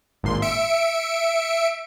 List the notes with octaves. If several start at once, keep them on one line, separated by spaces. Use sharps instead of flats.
G#1 A#2 C6
E5 C#7 D7